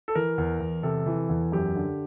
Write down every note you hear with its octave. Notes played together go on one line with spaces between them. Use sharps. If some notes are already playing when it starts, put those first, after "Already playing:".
A4
E3 A#4
E2
E2
C3 A4
E3
E2
F#2 G4
D3